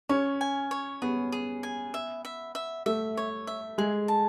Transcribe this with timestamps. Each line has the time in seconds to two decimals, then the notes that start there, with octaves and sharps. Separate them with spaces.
0.09 C#4 C#5
0.41 G#5
0.71 C#5
1.02 B3 G#4
1.32 G#4
1.63 G#5
1.94 E5
2.25 E5
2.55 E5
2.86 A3 E5
3.17 C#5
3.47 E5
3.78 G#3 G#4
4.08 A5